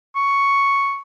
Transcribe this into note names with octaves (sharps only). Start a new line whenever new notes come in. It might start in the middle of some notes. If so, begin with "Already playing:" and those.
C#6